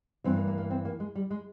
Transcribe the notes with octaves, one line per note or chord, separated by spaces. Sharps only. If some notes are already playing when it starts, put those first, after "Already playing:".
G2 E3 C4
A#3
A#3
A#3
C4
A#3
G#3
G3
G#3